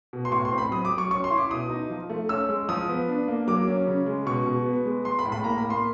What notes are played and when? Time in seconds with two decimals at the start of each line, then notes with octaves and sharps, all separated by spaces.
0.13 B2
0.25 C6
0.32 A2 C#6
0.45 C6
0.52 C4
0.58 B5
0.71 F#3 D#6
0.85 D6
0.91 F#3
0.98 C#6
1.11 C#4 C#6
1.24 C6
1.31 E4
1.38 D6
1.51 B2 D#6
1.70 D#4
1.90 F3
2.10 A3
2.29 C#4 E6
2.49 G#3
2.69 F3 D#6
2.88 B3
3.08 D4
3.28 A#3
3.47 F#3 D6
3.68 C#4
3.87 C#3
4.06 G#3
4.26 B2 C#6
4.46 B2
4.65 B3
4.85 G#3
5.05 G#3 C6
5.19 B5
5.25 A2
5.32 B5
5.44 A#3 A#5
5.58 B5
5.65 A#3
5.70 C6